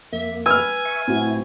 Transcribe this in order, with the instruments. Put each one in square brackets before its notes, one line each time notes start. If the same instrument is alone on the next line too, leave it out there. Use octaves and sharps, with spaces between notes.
[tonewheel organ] F2 A#3 [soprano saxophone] E5
[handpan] B4 [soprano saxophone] G#5 [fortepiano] E6 F6
[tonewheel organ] E5 C#6
[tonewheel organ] A2 E4 [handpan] C4 F#4